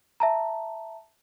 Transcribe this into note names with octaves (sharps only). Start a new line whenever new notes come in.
E5 A5 A#5